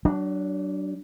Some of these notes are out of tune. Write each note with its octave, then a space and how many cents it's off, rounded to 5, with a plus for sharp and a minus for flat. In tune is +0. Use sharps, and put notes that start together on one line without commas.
F#3 +35 D4 +0